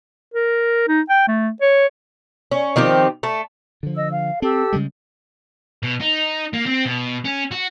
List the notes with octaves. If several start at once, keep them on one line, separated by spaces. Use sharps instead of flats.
A#4
D#4
G5
A3
C#5
C#4
D#3 F3 C4 G4
A3 A5
D3 F3
D#5 E6
F5
C4 G4 A4 E6
C#3 G3 G#3
B2
D#4
A#3
C4
B2
C#4
F#4